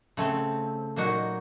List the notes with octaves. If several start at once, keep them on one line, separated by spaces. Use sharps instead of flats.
C#3 A3 C4
A#2 F#3 A#3 D#4 F#4